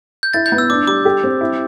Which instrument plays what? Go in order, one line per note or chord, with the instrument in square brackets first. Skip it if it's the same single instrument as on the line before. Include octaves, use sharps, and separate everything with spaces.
[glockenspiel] G6
[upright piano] E4 [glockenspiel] A6
[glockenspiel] G6
[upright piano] B3
[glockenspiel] E6
[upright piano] D4 [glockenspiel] D6
[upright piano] G3 [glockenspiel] D6
[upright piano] G4
C4
E4